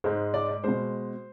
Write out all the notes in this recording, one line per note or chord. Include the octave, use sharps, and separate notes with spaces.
G#2 G#3 C5
D5
D5
B2 G#3 C5